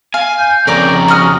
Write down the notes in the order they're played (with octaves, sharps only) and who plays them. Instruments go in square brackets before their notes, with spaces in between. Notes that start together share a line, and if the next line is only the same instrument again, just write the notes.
[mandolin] F5 [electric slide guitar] G#5
[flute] G6
[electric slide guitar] F2 C#3 [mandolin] A#4 D5 D6 [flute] A#5
[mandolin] F#4 D#6 F6